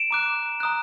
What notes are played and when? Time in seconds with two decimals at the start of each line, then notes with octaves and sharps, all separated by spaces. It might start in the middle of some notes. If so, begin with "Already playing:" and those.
Already playing: D7 E7
0.11 A#5 D6 F#6
0.60 A#5 D#6 F#6